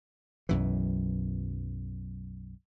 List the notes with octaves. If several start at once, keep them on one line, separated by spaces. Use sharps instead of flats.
B1 F#2 E3